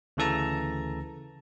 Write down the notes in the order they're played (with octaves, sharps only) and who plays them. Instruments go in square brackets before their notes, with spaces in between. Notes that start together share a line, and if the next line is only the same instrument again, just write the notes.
[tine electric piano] D2 C#3 E3 A4 A5 A#5